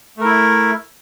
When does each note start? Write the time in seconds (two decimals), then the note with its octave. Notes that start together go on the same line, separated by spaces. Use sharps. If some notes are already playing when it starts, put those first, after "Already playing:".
0.17 A3
0.21 A#4
0.25 E4